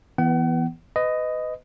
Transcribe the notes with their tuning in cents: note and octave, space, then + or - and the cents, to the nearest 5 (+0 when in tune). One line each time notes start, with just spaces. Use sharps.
E3 +0 B3 -15 F#5 +40
B4 +30 D#5 +0